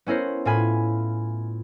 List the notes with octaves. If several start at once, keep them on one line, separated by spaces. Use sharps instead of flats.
B3 C#4 E4 A#4 C5
A2 F4 G#5 B5